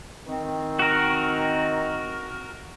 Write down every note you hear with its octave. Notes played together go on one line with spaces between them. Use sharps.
D#3 C4
F#4 A#4